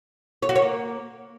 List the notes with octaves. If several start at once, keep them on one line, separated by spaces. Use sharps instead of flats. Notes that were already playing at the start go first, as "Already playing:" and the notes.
C#5
F#4
C#5
A#3